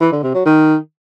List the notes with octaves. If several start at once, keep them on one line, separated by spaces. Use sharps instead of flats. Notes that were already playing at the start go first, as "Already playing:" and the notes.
E3
D3
C3
F#3
D#3